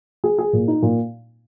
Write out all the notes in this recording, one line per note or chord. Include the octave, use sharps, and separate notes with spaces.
G#4
G#4
A#2
D#4
A#2